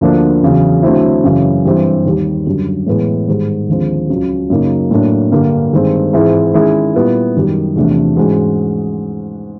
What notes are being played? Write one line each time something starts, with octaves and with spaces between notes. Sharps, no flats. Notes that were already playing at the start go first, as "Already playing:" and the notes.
D2 D3 F3 A#3 D4
E2 C#3 F#3
D3 F#3 A3 C4 E4
F#2 C#3 E3
G2 E3 G3 C4
D#2 D#3 G3
F#2 D3 G3
A2 E3 G#3 B3 E4
G#2 D#3 G3
D#2 D3 F3 G#3 C4
C#2 C#3 F#3
F#2 C#3 F#3 A#3 D#4
A2 F#3 A#3 D4
G2 D3 G3 A#3
G2 D#3 G#3 C4
G#2 E3 G#3 C4 E4
D#3 G#3 C#4 E4 G#4
A#2 G3 B3 E4
F#2 D#3 G3
E2 C3 F3 A3 D4
G#2 E3 G#3 C#4 F#4